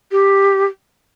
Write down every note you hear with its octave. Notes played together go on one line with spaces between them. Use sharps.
G4